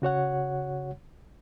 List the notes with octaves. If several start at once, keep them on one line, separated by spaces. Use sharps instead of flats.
C#3 F#4 C#5 F#5